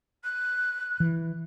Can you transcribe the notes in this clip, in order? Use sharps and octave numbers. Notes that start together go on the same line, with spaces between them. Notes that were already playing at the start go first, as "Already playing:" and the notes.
F#6
E3